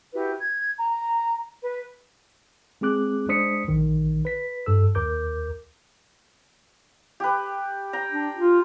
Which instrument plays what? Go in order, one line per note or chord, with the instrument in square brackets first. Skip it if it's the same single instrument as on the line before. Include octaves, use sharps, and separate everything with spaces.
[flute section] E4 F#4 G4 B4
G#6
A#5
B4
[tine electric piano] G#3 C4 G#4 D6 F#6
G#3 D4 C5 D#6 B6 C#7
A#1 D#3
B4 B6
G2 A4 E6
D#2 A#4 D6 G6
[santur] G4 B4
G5 A#5
[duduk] D4
F4